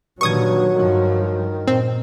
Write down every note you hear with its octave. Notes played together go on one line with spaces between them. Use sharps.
G2 A#2 D3 D#3 F#3 C#6 D#6 G#6
G2 D#3 F3
A#2 C4